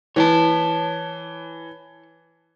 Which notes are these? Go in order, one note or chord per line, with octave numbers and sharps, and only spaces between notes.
E3 C#5 G#5 A5